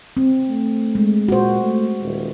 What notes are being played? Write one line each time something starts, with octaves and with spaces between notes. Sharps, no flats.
C4
A3
G#3
A#2 F#4 C5
A3
D#1